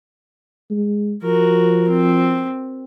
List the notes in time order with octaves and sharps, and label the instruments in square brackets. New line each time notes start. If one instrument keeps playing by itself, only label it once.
[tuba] G#3
[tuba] F3 [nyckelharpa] F#4 A#4
[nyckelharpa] C4